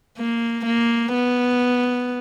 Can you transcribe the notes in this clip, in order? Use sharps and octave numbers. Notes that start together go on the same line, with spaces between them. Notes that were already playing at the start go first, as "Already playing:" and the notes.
A#3
A#3
B3